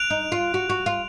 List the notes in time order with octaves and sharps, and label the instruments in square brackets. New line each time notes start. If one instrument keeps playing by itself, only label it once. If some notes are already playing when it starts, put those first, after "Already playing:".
Already playing: [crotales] F#6 D7 F7
[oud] D#4
F4
F#4
F#4
F4